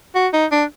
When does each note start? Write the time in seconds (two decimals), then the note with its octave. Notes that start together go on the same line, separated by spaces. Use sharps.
0.15 F#4
0.33 D#4
0.52 D4